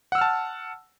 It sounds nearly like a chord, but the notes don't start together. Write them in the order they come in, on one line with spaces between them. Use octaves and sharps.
F#5 E6 F6 A5